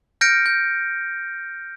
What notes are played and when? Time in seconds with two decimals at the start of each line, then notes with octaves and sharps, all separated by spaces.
0.21 F6 G6 A#6 C#7 D7
0.46 G6